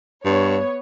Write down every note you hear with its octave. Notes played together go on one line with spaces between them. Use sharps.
G2 B3 C#5